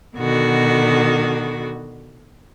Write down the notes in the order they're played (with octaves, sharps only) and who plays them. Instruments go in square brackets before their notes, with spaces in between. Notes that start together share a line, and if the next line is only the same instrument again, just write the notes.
[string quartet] B2 D3 D#3 F#4